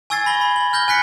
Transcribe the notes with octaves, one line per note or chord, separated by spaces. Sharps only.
G#5 C#6 E6 G#6 A6 C7
B5 A#6 G7
B5
F#7
F6 G6 A#6 G7
G#5 F#6 B6 C#7